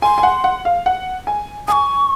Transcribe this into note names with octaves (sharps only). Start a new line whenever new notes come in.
G#5 C6
G#5
F#5
F#5
F5
F#5
G#5
G#5 C#6 D#6